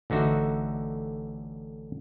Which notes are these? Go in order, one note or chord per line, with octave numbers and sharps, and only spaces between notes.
A1 D3 D#4 F#4 E5